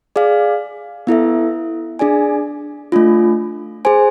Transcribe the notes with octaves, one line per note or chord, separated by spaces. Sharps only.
G#4 D5 F5
B3 E4 A4 E5
D4 G#4 D5 G#5
A3 D4 F4
G#4 C5 G#5